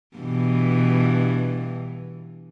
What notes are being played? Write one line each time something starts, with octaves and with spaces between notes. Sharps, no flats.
G2 B2 E3